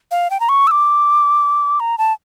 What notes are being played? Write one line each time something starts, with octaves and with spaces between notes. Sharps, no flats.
F5
G5
A#5
C#6
E6
D6
A#5
A5